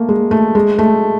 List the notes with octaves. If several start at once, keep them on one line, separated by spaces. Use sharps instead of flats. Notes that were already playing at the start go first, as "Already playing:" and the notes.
Already playing: A3 A#3
G#3
A3
G#3
A3